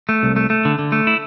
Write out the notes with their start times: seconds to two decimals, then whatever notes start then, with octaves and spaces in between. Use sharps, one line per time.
0.09 A3
0.23 C2
0.36 A3
0.50 A3
0.65 D3
0.79 D3
0.92 A3
1.07 E4